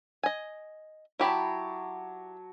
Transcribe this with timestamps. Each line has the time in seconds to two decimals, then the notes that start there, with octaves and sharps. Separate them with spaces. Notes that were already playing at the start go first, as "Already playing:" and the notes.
0.23 D#5 G#5
1.19 F#3 E4 G4 A5 B5